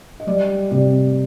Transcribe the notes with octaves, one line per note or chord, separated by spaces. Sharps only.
D#5
G3 D5
C3 D5